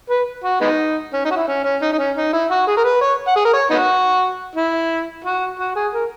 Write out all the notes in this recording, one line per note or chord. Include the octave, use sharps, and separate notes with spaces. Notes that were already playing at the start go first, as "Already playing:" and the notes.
B4
F#4
G#3 B3 D#4
C#4
D#4
F#4
E4
C#4
C#4
D#4
D#4
C#4
D#4
E4
F#4
G#4
A#4
B4
C#5
F#5
G#4
A#4
C#5
B3 D#4 F#4
E4
F#4
F#4
G#4
A#4